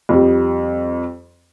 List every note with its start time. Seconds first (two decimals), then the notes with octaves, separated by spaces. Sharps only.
0.09 F2 G3